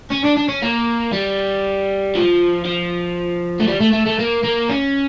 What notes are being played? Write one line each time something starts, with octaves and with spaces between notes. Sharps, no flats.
C#4
D4
D4
C#4
A#3
G3
F3
F3
A3
G3
A3
A3
A3
A#3
A#3
C#4